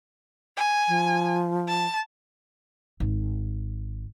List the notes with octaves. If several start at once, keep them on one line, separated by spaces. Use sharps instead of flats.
G#5
F3
A5
G#1